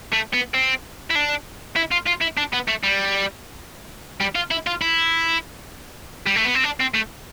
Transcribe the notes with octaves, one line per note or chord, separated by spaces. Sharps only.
A3
B3
C4
E4
D4
E4
F4
F4
E4
D4
B3
A3
G3
G3
F4
E4
F4
E4
G3
A3
B3
C4
D4
C4
A3